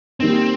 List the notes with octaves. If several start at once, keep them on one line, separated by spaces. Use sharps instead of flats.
D#3 G3 A#3 C4 D#4